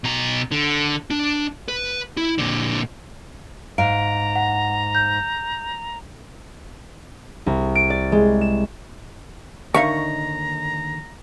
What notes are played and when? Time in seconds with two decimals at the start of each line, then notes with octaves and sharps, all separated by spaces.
0.04 B2 A#5
0.51 D3
1.10 D4
1.68 B4
2.17 E4
2.38 A#2 D3
3.78 G#2 F5 A#5 D7
4.36 F#5
4.95 G6
7.46 C2
7.75 D7
7.90 D5
8.12 G#3
8.41 E7
9.74 D#2 D3 D#3 A#4 E5 F5 A#5 C#6